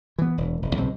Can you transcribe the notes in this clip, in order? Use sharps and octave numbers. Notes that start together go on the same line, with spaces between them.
E3 B3
E1
F1 E2
B1 C#3 C4